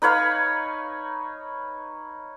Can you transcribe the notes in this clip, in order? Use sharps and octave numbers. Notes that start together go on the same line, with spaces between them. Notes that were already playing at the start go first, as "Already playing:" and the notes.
D#4 B4 C#5 F5